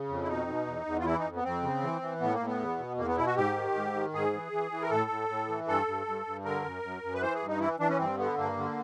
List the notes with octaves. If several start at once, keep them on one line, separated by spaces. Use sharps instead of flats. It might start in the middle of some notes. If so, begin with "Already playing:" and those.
Already playing: C#3
F2
E4
B2 D#4
B2
E2
E2
F4
E3 E4
D#4
F2
B3
F2 C4
C#3
E3
E3
A2 B3
A#3
A2
B3
E2
B2
E2 A#3
B3
B2 E4
F#4
G#2 G4
D#3
G#2
D#3
G#2 G#4
E3
E3
E3
A#4
A2 A4
A2
A2
E3
G2 A4
G2
G2
G2
D3 A#4
F#2
F#2
F#2
B4
E3 C5
G#4
G2
D#4
E3 E4
E3 D4
C#4
G2 C4
D3 B3
G2 A#3
D3